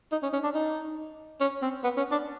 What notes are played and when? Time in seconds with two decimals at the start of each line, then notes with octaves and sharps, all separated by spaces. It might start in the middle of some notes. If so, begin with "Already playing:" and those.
0.12 D#4
0.23 C#4
0.33 C#4
0.44 D4
0.55 D#4
1.41 C#4
1.62 C4
1.84 B3
1.97 C#4
2.12 D4